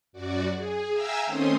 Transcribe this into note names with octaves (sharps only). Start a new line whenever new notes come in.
F#2 F#4 D5
G#4
E5 F5 G5 G#5 A#5 E6
D#3 A3 C4 C#4 C6 D#6